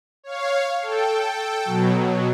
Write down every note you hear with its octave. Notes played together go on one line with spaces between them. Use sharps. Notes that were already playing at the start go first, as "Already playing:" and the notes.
C#5 F5
A4 G5
B2 F#3